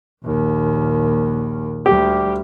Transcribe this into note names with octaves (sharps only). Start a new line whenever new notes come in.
A#1 D#2
D2 G3 G4